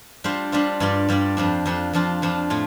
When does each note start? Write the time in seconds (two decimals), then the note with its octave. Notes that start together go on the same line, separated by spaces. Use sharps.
0.24 G3 D4 F4 C5
0.52 G3 D4 F4 C5
0.80 G2 G3 F4 D5
1.09 G2 G3 F4 D5
1.37 F2 F3 D4
1.66 F2 F3 D4
1.93 F2 F3 D4 F4
2.22 F2 F3 D4 F4
2.50 A2 A3 F4